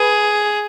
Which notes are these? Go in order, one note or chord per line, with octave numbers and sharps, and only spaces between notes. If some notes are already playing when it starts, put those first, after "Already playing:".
Already playing: G#4 B4